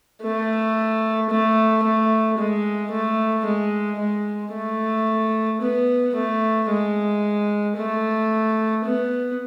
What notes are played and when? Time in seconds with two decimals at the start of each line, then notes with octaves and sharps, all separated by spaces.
0.22 A3
1.30 A3
1.83 A3
2.38 G#3
2.92 A3
3.46 G#3
4.00 G#3
4.53 A3
5.61 B3
6.15 A3
6.69 G#3
7.77 A3
8.85 B3